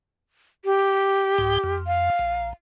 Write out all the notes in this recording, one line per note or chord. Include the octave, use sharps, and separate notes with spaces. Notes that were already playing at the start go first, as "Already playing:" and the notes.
G4
C2 G#2 G5
F2
F5
A#1